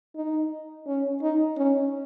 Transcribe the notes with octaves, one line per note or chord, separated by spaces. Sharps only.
D#4
C#4
D#4
C#4